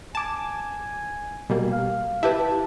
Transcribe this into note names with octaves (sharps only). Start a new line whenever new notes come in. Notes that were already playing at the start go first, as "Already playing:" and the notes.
G#5 A5 D6
B2 G3 A#3
F5
E4 G4 B4 A5